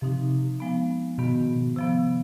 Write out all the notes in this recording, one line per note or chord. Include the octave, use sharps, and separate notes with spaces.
C3 F3 C4 D#4
F3 G#3 B3
G#2 B2 D#3 B3
C3 F3 B3